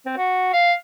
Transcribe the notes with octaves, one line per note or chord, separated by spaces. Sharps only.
C4
F#4
F5